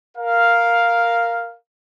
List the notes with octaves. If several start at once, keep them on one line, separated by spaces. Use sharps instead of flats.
A#4 F5